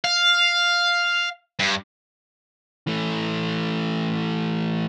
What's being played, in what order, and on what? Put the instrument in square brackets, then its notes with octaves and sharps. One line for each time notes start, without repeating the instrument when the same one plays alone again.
[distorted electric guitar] F5
G2
[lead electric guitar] E3 A3